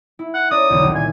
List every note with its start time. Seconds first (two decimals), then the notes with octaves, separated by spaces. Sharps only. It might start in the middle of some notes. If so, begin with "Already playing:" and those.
0.19 E4
0.34 F#5
0.51 C#4 A#4 D5 D#6
0.70 B1 E2 D3
0.82 C2 D#3
0.95 A#2 G#5